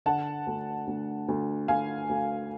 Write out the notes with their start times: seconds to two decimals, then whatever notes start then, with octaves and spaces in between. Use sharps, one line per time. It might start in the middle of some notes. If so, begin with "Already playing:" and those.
0.06 D3 F#5 A5
0.47 D2
0.87 D2
1.28 D2
1.68 D2 F5 G#5
2.09 D2